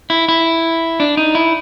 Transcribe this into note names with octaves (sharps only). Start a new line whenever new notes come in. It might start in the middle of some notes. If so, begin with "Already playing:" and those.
E4
E4
D4
D#4
E4